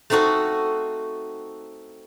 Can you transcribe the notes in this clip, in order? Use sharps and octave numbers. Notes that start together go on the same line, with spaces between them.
A3 C4 D#4 F#4 A4